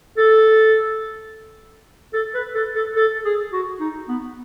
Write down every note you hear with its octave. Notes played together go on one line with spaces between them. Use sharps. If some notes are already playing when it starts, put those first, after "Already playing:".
A4
A4
B4
A4
A4
A4
G#4
F#4
D#4
B3